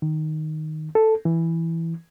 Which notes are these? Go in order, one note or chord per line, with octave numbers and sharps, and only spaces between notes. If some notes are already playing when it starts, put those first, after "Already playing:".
D#3
A4
E3